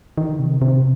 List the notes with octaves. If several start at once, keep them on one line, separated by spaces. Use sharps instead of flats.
D#3
C3
C3